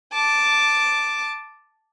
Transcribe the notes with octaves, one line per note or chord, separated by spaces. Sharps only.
A5 D6